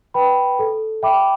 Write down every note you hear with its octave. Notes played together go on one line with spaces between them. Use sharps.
B4 G5 B5
A4
E5 G5 B5 D6